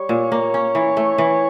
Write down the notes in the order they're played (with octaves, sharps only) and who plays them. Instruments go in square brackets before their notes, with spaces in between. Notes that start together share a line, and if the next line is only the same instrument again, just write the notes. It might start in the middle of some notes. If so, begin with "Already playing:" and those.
Already playing: [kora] G3 [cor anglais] C#5
[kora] A#2
A#3
C#4
E3
A3
E3